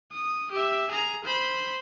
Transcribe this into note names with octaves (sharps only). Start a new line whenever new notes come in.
D#6
G4 E5
G#4 A#5
C5 B5